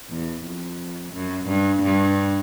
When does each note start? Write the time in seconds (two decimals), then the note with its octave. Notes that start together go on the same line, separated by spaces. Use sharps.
0.10 E2
0.45 F2
1.13 F#2
1.48 G2
1.83 G2